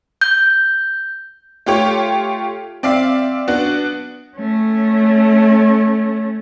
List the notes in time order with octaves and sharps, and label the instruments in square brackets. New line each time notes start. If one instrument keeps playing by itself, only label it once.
[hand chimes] G6
[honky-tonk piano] A3 F4 G4 C#5
C4 D5 E5 F5
B3 D4 F#4
[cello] A3 C#4